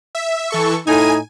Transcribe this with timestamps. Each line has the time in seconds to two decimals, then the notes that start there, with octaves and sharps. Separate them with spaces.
0.15 E5
0.50 E3 A4 C#6
0.87 A2 D#4 G#5 D#7